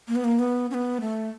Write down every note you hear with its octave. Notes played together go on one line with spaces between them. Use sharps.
A#3
B3
A#3
B3
C#4
B3
A3